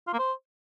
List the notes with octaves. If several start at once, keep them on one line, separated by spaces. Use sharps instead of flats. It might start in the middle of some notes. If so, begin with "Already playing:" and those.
F4
A#3
C5